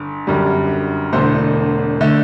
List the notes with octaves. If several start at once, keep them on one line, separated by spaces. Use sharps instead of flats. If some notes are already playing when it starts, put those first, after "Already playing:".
Already playing: G1
G1 F#2 D3 G3
E1 E2 D3 A3 C5
D3 A3